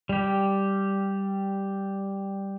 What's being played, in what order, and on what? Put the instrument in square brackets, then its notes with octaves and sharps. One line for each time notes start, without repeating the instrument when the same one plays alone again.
[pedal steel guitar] G3 G4